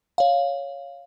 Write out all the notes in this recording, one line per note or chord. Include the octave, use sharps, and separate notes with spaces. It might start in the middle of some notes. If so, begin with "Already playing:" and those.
C#5 F5